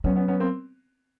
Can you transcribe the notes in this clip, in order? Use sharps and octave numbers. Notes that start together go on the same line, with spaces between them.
F#3 B3 C#4
B3 C#4
B3 C#4
A#3 C4